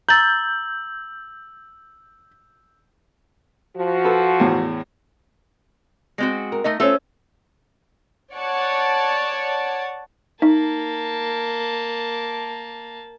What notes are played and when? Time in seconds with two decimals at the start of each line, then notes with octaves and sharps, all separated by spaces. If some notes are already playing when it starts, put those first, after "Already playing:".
0.09 A#5 E6 G6 A6 F#7
3.76 F3 F#4
4.04 A4 B4
4.40 E2 A2
6.18 G#3 C4 F#4
6.52 A#4
6.64 A3 D#4 D#5
6.80 A3 C#4 F4 A4 C5 E5
8.34 C#5 D5 F#5 A5
10.42 A#3 D#4 A5